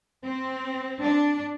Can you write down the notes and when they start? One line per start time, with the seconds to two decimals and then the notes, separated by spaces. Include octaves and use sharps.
0.22 C4
0.99 D4